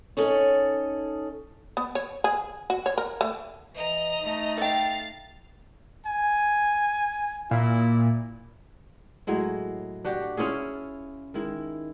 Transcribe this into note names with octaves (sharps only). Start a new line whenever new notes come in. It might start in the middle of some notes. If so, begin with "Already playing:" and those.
C#4 D#4 G#4 A4 C#5
B3
C#5
G#4
F#4
C#5
A#4
A3
E3 D#5 A#5
A3 D#4
A4 F5 G5 A6
G#5
A#2 E4
A2 F#3 G#3 E4
D4 F#4 G4
C#4 E4 F4 G#4
D#3 G#3 E4